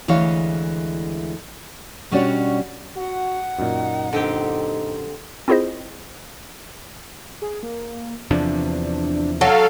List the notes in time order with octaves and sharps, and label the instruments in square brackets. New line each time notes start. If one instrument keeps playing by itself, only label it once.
[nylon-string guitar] D2 E3 G#3 C#5 F5
B2 G3 C#4 D4 F#4 C#5
[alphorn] F#4 [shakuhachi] F#5
[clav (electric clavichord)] F#2 A#2 [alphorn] D#4
[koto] D3 C4 G4 [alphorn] D#4
[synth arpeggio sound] C4 E4 F4 G#4 C5 D#5
[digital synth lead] G#4
A#3
[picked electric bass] E2 C3 F3 [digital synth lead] D4
[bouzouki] F#3 [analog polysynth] A4 F5 [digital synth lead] G#5